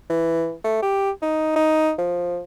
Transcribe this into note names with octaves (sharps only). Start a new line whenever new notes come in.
E3
A3
G4
D#4
D#4
F3